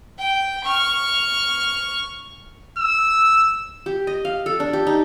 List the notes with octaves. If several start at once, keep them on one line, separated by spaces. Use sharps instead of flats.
G5
C#6 F6
E6
G4
D#5
F5
A4
D4
G4
D#4